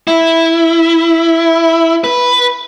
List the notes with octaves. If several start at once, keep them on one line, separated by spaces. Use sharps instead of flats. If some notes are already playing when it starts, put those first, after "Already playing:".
E4
B4